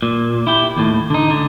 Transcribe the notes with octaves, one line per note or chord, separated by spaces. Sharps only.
A#2
E4 G4
D#2 A2
D3 D#4
C#2 D3